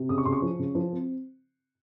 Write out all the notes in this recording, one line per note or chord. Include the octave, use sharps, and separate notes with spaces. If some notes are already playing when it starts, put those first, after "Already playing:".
Already playing: C3
C#3 D#6
C#6
C#3 C6
C#6
F3
C#3
F3
C4